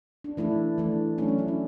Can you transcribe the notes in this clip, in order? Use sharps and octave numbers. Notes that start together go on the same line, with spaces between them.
D4
E3 A3 D4 E4
E3 A3 D4
F#3 A3 C#4 D4
D4
E4
D4